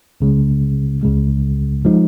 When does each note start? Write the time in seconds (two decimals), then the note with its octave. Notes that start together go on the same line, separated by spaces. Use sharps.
0.21 C#2 C#3 G#3
1.03 C#2 C#3 G#3
1.85 F3 G#3 D#4